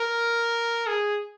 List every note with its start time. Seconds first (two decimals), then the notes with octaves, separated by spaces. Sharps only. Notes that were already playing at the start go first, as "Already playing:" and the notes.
Already playing: A#4
0.87 G#4